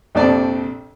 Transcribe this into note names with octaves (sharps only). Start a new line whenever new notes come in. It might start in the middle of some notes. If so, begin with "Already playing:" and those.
A#1 F2 C3 C4 D5 A5